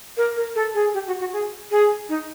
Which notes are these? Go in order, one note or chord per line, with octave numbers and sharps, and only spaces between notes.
A#4
A#4
A4
G#4
G4
F#4
F#4
G#4
G#4
D#4